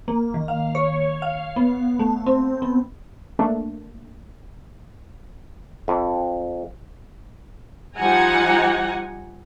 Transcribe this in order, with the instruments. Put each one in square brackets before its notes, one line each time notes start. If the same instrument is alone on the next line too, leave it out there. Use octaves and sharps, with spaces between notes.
[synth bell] A#3
D#3
F5
C#5
F5
B3
A3
C4
B3
[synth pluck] A3 A#3 D4
[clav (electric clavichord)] F2
[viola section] F3 G3 D#4 F#5 G#5 A#5